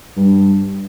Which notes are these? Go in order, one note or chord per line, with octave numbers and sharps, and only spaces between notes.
G2